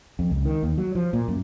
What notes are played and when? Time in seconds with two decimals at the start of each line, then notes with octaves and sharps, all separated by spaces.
0.19 F2
0.30 C#2
0.45 D#3
0.63 D#2
0.78 F#3
0.95 F3
1.13 A#2
1.28 F#2